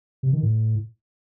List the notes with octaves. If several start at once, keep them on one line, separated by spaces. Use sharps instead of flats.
C3
D#3
A2